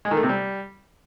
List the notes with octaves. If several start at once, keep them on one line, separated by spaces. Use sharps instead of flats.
G#3
D#3
A3
C3
G3